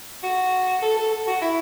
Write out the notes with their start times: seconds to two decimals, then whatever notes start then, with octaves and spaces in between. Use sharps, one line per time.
0.23 F#4
0.82 A4
0.97 A4
1.12 A4
1.27 F#4
1.42 E4